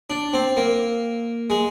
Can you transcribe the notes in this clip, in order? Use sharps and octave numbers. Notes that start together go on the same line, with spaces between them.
D4
C4
A#3
G#3